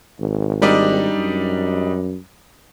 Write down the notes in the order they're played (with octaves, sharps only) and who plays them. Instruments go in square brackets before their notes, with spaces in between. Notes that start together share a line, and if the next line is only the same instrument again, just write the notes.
[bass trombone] G#1
[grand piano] G3 D4 D#4
[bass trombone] F#2